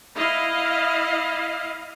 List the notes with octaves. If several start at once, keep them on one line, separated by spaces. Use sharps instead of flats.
E4 D#5 F5